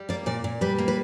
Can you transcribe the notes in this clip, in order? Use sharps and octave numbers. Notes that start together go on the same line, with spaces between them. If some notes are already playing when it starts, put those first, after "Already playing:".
Already playing: G3
A#3 D5
A#2 D5
A#2
G3 B4
A#3
B4